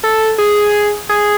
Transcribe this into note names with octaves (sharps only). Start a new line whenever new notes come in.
A4
G#4
G#4